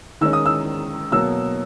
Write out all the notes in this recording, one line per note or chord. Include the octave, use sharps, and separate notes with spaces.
D#3 G#3 C#4 E6
D#6
E6
B2 F#3 A#3 E6